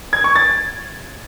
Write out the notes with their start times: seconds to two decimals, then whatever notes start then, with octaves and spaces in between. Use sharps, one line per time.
0.13 G#6
0.24 C#6
0.36 A6